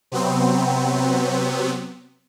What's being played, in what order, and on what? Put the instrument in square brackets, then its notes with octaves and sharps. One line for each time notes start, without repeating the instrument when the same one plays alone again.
[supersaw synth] C3 F#3 B3 C4